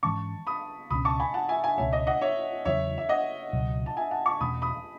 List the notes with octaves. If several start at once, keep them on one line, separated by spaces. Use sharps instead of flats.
G#2 E3 G#3 C#4 A5 C#6
B5 D#6
C#2 B2 A3 C#4 B5 D#6
A5 C#6
G#5 B5
F#5 A5
E5 G#5
E5 G#5
C#2 B2 A3 C#4 C#5 E5
D#5
D#5 F#5
C#5 E5
E2 C#3 F#3 B3 C#5 E5
E5
D#5 F#5
C#2 B2 F#3
A5
E5 G#5
F#5 A5
A5 C#6
E2 B2 A3 C#4 B5 D#6
B5 D#6